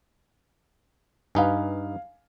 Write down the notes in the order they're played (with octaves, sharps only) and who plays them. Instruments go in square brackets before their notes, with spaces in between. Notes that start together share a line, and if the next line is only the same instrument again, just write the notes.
[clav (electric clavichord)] G2 D#4 B4 [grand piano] F5 G#5